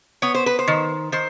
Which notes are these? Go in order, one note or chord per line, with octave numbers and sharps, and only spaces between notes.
B3 C#5
C5
B4
C5
D#3
D#3 C5